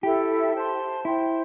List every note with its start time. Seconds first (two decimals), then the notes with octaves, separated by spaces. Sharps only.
0.02 E4 G4 A4 E5
0.54 C5 A5 C6
1.05 E4 C5 G5 C6